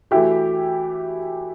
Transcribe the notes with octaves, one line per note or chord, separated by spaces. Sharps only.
E3 A3 E4 F#4 G4